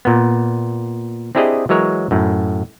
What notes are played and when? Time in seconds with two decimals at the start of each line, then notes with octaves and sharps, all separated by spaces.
0.05 A#2 B3
1.35 C4 D4 E4 G4 G#4 D#5
1.69 E3 F#3 G#3 A#4 C#5
2.11 F#2 A2